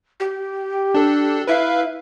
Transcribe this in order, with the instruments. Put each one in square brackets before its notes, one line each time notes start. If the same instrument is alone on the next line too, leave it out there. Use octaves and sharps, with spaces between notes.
[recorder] G4
[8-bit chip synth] D4 A4
[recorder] E4 [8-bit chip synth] B4 E5 F5